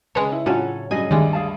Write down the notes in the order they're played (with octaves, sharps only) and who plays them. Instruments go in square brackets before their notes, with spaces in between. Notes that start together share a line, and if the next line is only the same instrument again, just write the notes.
[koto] C#3 G#3 C#5 [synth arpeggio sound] B4 A5
[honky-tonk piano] E4
[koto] A2 F#3 C#4 [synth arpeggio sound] D4 F4 [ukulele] F#4 A4 C#5
[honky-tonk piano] G2 F#3 C#4 [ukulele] G#4 D#5 [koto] G#5
[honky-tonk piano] D2 G2 [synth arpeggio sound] D#3 [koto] G3 G#3
[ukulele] G#4 F5 A5